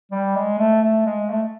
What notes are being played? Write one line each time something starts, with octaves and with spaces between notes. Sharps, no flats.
G3
G#3
A3
A3
G#3
A3